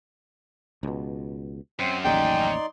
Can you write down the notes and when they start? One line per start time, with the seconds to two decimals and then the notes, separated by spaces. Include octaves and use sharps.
0.83 C#2 B2
1.79 F#2 C4 C5
2.05 A1 D#2 C#3 D#4 D5 G5 C6